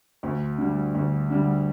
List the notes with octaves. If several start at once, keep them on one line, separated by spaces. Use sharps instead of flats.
D2
D3 G3
D2
D3 G3